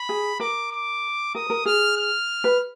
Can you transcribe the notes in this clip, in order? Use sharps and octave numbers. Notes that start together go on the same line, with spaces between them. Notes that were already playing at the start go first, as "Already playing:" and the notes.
Already playing: B5
G#4
A#4 D6
D6
A#4 D#6
A#4
G#4 F6
F6
B4